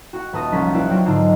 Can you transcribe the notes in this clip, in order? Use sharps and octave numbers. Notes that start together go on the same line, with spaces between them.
F#4 F#5
D#1 B4 A5 D#6 A#6
C2 F3 C#4 A#4 F#5 B6
E4 F4 B4 D5 F#5
F#3 C4 D4 F4
G#2 D3 D4 D#4 F4